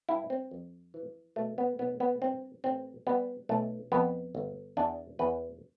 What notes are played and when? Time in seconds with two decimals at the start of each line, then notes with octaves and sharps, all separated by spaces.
0.09 G2 E4
0.30 C4
0.51 F2
0.94 E3
1.36 B2 A3
1.58 B3
1.79 B1 B3
2.00 B3
2.22 G2 C4
2.64 A1 C4
3.07 G3 B3
3.49 B1 A3
3.92 F2 B3
4.35 G1
4.77 E2 D4
5.19 E2 B4